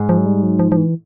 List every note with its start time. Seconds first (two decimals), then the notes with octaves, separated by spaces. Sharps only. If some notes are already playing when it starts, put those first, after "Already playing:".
Already playing: G#2
0.09 F3
0.18 F#3
0.26 G3
0.43 F#3
0.59 F3
0.72 F3
0.77 E3